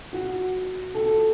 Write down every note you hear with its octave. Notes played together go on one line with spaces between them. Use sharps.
F#4
A4